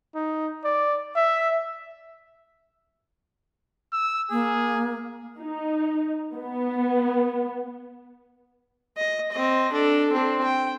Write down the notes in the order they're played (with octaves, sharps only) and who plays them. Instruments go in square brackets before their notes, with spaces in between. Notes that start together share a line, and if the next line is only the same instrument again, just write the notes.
[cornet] D#4
D5
E5
[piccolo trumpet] E6
[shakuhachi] A#3 [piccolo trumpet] G#4
[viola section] D#4
B3
[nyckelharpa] D#5
C4 D#5
D4 A4
C4 D4
G5